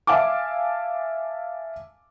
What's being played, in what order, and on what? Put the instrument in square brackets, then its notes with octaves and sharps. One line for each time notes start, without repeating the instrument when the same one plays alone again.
[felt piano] E5 F5 G#5 A5 D6